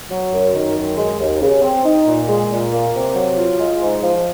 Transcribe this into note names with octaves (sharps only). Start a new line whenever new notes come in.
F#3
F#2
D#3
F#2
G#3
D#2
C#3
C4
D#4
A#2
G#3
A#2
A#3
C3
F#3
F4
G#3
G#2
F3